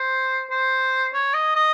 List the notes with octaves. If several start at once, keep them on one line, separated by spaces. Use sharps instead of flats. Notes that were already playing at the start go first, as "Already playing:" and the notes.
Already playing: C5
C5
C#5
D#5
D#5